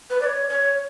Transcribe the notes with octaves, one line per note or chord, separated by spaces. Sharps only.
B4
D5
C#5
C#5